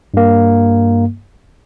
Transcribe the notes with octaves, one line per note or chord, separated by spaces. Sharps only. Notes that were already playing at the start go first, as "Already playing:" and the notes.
G2 A#3